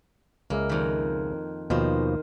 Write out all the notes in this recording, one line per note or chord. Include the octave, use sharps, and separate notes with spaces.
C#2 G#3 A#3 E5
F2 D#3
D#2 B2 D#3 F3 C5